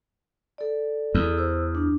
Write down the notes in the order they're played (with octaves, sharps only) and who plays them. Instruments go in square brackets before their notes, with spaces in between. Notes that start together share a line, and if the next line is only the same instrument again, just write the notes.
[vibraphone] A4 D5
[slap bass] E2
[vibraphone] C5 E6
D4